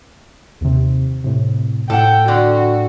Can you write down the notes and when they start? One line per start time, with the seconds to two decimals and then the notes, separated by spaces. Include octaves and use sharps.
0.61 D#2 C3
1.24 A2 C3
1.90 A2 A4 F#5 G5
2.28 D3 F#4